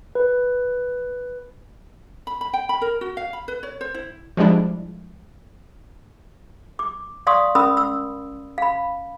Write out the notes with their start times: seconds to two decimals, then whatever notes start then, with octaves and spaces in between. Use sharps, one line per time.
0.15 B4
2.27 B5
2.41 B5
2.53 G5
2.69 B5
2.81 A#4
3.01 F#4
3.17 F5
3.33 B5
3.48 B4
3.63 C#5
3.81 C5
3.94 E4
4.37 F3 G3 G#3 D4 E4
6.79 D6
7.27 D5 F5 C6 C#6 D#6
7.55 C#4 A#4 B5 D#6 E6
7.77 E6
8.58 F5 B5